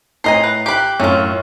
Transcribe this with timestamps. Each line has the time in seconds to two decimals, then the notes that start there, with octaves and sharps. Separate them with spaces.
0.24 A2 C5 D#5 G#5 A#5 C7
0.44 B4
0.66 G4 G5 B5 F#6
1.00 F#2 A2 C#4 F4